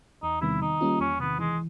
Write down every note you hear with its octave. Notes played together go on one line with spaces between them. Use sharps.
E2 D#4
C3 D#3 G3 B3 E4
D#3 D#4
G3 A#3 C#4 F4
E2 C#4
C3 D#3 B3
E3 G#3